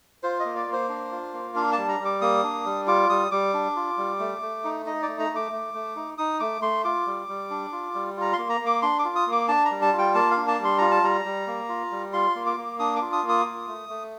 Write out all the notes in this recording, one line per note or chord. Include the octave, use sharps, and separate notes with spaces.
F4 C5
D#5
A#3
D5
A#3
C5
D4
F4
A#3
D4 F5
A5
G3
A#5
G3
D6
A#3 D#6
D4
G3
F4 D6
G3 D#6
G3 D6
D4
F4
G3
A3
A3
D#4
D#4 D#5
D5
A3
A#5
A3
D6
A3
A3
D#4
D#4 D#6
A3 D6
A3 C6
F4 D6
G3
G3
D4
F4
G3
F4 A#5
C6
A#3
A#5
A#3
D6
D4 C6
D6
F4
D#6
A#3
D6
D4 A5
A#5
G3
A5
F4
G5
A#3 A5
F5
D4
A5
G3
C6
F4 A#5
A5
G3 A#5
G3
A#3
F4
G3
F4 C6
A#3
D6
A#3
D4 D#6
D6
F4
D#6
A#3
D#6
F4
A3
A3